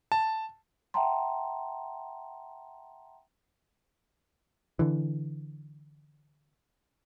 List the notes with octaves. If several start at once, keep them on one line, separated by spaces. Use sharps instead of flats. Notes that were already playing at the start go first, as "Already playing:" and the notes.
A5
E5 F#5 G5 A5 A#5 C6
D3 E3